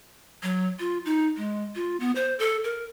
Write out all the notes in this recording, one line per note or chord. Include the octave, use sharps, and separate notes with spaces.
F#3
F4
D#4
G#3
F4
B3
C5
A4
A#4